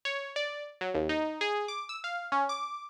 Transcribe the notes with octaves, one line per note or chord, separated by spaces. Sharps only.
C#5
D5
F#3
D#2
D#4
G#4
D6
E6
F5
C#4
D6